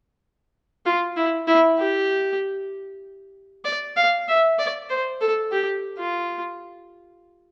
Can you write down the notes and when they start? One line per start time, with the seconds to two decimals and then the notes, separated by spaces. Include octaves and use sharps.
0.85 F4
1.16 E4
1.47 E4
1.79 G4
3.65 D5
3.97 F5
4.28 E5
4.59 D5
4.90 C5
5.21 A4
5.52 G4
5.98 F4